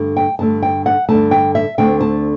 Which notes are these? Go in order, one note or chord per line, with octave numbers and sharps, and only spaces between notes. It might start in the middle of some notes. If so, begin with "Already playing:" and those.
Already playing: G2 D3 A3
G5
G2 D3 A3 A5
G5
F#5
G2 D3 A3 A5
G5
E5
D2 D3 A3 C4 G5
A5